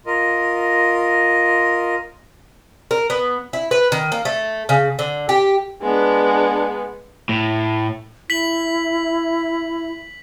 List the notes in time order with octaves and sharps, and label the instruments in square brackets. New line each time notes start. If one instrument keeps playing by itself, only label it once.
[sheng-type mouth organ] F4 A#4 D#5
[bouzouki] A#4
B3
E4
B4
D#3
A#3
A3
C#3
D3
G4
[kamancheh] G#3 B3 [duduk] D4
[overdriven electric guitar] A2
[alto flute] E4 [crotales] B6 F#7